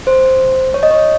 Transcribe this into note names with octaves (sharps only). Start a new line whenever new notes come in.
C5
C#5
D#5
C#5